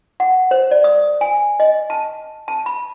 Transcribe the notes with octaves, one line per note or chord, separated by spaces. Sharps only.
F#5
C5
D5
D#6
G#5
D#5
A5
A5
B5